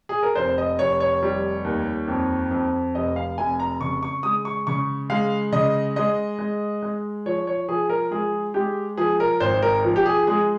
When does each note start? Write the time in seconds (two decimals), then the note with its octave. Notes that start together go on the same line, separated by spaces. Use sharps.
0.09 G#4
0.23 A#4
0.35 F1 C5
0.58 D#5
0.79 F1 C#5
1.00 C#5
1.23 G3
1.65 D#2
2.08 F2
2.51 F2
2.95 F1 D#5
3.16 F5
3.38 F1 G#5
3.60 A#5
3.80 C#3 C#6
4.03 C#6
4.23 G#3 D#6
4.45 C#6
4.67 C#3 C#6
5.10 G#3 F5
5.52 C#3 D#5
5.96 G#3 D#5
6.39 G#3
6.82 G#3
7.26 F3 C#5
7.47 C#5
7.69 F3 G#4
7.90 A#4
8.11 G#3 G#4
8.54 G#3 G4
8.98 F3 G#4
9.20 A#4
9.40 G#1 C5
9.63 A#4
9.84 F3
9.96 G4
10.06 G#4
10.27 G#3 G#4